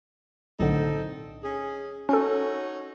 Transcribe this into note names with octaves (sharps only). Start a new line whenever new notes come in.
B1 A2 D3 C4 D#4 A4
C#4 G#4
C#4 D#4 F#4 A4 C#5